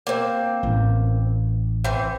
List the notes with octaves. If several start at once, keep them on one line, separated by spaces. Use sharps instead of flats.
A#3 C4
A1
E3 C4